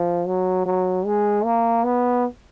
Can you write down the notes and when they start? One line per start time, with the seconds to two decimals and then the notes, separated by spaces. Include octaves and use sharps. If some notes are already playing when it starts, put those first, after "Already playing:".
Already playing: F3
0.27 F#3
0.66 F#3
1.05 G#3
1.44 A#3
1.84 B3